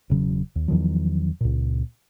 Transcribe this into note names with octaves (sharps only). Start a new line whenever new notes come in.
E1 C#3 F#3
D#2
E2 D#3 F3 F#3
C#2 A#2